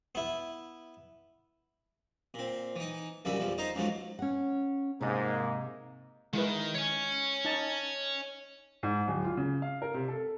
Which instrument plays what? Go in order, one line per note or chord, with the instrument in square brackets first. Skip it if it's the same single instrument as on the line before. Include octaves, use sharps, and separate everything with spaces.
[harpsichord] B3 E4
A#2 C4
E3 D#4
A#1 D#2 C#3 G3 F#4 E5
E2 F3 G3
D#4 A4 C5 D#5 A#5
C#2 G#2 F3 F#3 A3
[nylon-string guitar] C#4 F#5
[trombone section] G#2 A#3 [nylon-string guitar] C3 D#5
[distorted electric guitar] D#3 [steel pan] G#3 E4 B4
[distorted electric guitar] C#5 G#5
[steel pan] D#4 A5
[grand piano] G#2
D1
F4
C#3
F5
A#4
C3
A4